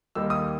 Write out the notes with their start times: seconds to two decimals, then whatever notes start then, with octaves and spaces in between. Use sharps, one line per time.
0.15 D#2 D#3 G3 A#3 D#4 E6
0.30 D#6